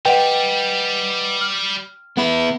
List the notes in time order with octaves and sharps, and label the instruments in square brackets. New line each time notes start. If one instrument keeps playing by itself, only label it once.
[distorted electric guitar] G3 [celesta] B4 D#5 F#5 [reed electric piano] G5
[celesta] F6
[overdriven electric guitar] B3 E4